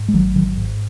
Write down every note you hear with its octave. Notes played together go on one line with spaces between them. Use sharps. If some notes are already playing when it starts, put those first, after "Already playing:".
Already playing: G#2
G#3
G#1 D#3 F#3
D#3 F#3
G#2